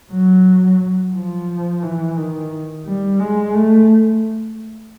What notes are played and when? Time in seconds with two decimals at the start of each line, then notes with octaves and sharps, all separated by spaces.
0.12 F#3
1.14 F3
1.83 E3
2.17 D#3
2.86 G3
3.19 G#3
3.55 A3